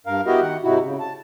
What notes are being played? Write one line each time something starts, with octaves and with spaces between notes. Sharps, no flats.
G2 A#4 F5
B3 E4 F#4 G4 A#4 D#5
D#3 F#5
G#2 C3 D#4 E4 F#4
C#3
A5